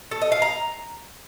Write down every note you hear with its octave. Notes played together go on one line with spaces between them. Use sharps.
A4
D#5
F5
A#5